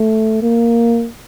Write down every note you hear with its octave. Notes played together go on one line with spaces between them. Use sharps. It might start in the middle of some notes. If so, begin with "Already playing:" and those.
Already playing: A3
A#3